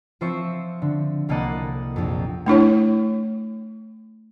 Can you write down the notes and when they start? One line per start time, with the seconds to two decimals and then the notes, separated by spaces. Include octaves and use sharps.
0.21 F3 C4 F4 C5 E5 C#6
0.82 D3
1.29 C2 A#3 A4 D#5 F#5
1.96 A#1 F2
2.46 A3 D4 E4 C#5